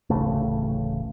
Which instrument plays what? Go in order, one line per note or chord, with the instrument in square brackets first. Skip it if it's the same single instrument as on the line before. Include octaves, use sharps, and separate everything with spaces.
[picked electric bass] D1 A1 C#3 A3